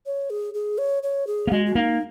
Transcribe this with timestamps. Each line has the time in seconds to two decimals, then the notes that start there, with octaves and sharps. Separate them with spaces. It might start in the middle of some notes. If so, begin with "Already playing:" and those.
0.06 C#5
0.30 G#4
0.54 G#4
0.78 C#5
1.03 C#5
1.27 G#4
1.47 A#3
1.52 G#3 F#4
1.66 F#4
1.75 A#3 D#4